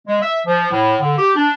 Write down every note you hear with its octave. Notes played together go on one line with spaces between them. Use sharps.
G#3
E5
F3
A2
D3
G4
D4